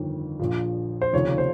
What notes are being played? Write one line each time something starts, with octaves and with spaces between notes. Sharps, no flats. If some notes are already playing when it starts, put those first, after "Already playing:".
Already playing: G1 F2 D#3
A#1 A#2 F3
C5
F1 D#2 C#3 F3 C#5
C5